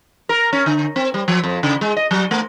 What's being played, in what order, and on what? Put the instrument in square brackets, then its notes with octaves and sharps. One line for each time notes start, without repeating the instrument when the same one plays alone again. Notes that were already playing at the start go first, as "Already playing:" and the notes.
[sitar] A#4
C#4
D3
C4
G3
F3
F2
C#3
G#3
D#5
F#3
A3